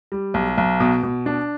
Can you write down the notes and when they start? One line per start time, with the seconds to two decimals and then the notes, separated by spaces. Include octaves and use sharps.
0.12 G3
0.34 B1
0.58 B1
0.80 B2
1.03 B2
1.26 D4